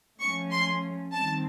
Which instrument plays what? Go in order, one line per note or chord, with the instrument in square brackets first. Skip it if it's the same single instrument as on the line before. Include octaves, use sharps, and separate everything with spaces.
[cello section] F3 A3 C#4 [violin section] C#6
[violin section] C6
[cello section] D#3 G3 C4 [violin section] A5